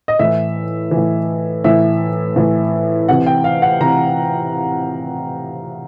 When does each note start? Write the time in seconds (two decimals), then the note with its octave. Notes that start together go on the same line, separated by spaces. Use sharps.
0.08 D#5
0.19 A2 E3 E5
0.91 E3
0.97 A2
1.64 A2 E3 E5
2.36 A2 E3
3.08 C3 F#5
3.12 E3
3.26 G5
3.44 F5
3.62 F#5
3.81 C3 E3 A#5